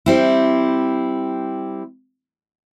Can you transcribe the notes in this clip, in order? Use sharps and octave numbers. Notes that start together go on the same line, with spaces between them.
G3 C4 E4